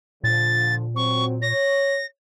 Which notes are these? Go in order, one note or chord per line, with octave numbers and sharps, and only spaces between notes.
A#2 D3 F3 A6
F#3 C4 C#6
C#5 A#6